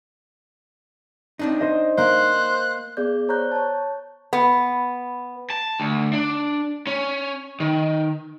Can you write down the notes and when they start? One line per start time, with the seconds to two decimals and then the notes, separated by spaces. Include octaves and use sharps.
1.39 C4 D4 D#4
1.61 C5 D#5
1.98 A#3 C5 F#6
2.97 B3 G#4 D5 G6
3.28 C5 C#5 A#5 C#6 F#6 G6
3.52 C#5 A5
4.33 B3
5.50 A5
5.80 D2
6.13 D4
6.87 C#4
7.60 D#3